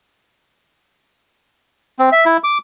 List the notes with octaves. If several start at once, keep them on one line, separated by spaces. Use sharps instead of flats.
C4
E5
E4
D6